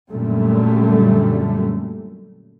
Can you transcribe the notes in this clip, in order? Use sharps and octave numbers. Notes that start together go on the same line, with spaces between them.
F#2 A#2 D3 G3 A3